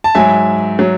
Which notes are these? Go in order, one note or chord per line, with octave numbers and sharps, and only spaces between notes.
A5
G#2 F#3 E5 G#5
F#3